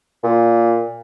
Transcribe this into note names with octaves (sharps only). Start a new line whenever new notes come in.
A#2